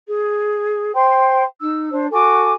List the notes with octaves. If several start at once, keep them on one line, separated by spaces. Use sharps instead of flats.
G#4
C5 G5 C6
D#4 E6
D4 C5
F#4 A4 G#5 D6